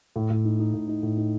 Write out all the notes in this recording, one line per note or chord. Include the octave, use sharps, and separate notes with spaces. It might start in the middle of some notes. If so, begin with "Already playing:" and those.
A2
A2
D#4
D#4
A2
D#4
A2
D#4